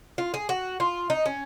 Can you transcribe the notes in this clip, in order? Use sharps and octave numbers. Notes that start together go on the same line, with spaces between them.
F4
G#4
F#4
F4
D#4
C#4